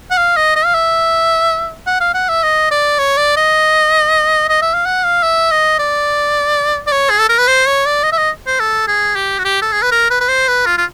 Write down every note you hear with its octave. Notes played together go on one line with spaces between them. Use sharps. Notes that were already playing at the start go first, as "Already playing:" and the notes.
F#5
F5
D#5
D#5
F5
E5
F#5
F5
F#5
E5
D#5
D5
C#5
D5
D#5
D#5
E5
F5
F#5
F5
E5
D#5
D5
D5
C#5
G#4
A4
A#4
B4
C5
C#5
D5
D#5
E5
D#5
C5
A4
G#4
G4
F#4
G4
A4
G#4
B4
A#4
B4
B4
C5
B4
F4
F4